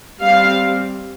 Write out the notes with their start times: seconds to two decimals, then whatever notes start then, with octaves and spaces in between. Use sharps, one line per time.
0.21 G3 C4 F5